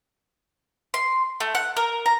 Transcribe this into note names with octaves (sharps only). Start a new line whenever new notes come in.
C6
A3
F#5
A#4
A#5